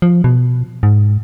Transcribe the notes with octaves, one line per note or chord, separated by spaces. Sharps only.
F3
B2
G#2